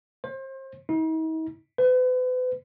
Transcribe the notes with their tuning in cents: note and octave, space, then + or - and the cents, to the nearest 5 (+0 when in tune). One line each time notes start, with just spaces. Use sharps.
C5 +35
D#4 +45
B4 +40